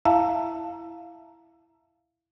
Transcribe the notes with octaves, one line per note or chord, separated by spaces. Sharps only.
E4 E5 F5 A5 A#5